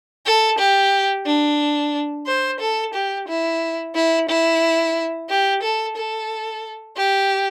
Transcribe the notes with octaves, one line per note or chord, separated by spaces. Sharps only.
A4
G4
D4
C5
A4
G4
E4
E4
E4
G4
A4
A4
G4